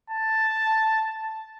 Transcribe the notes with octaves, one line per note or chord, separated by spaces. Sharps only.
A5